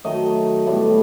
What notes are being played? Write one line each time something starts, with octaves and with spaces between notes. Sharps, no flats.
D#3 F#3 A3 D#5
A2 G3 B3